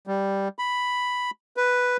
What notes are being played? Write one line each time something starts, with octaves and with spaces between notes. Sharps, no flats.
G3
B5
B4